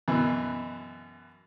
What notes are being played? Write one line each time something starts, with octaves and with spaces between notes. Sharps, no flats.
F#2 B2 E3